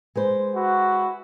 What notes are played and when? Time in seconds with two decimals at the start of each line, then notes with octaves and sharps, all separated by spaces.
0.15 G#3 B4 C5
0.55 E4 F#4